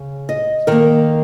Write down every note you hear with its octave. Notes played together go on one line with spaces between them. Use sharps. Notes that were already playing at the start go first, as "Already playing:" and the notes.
Already playing: C#3
D#5
D#3 A#3 A#4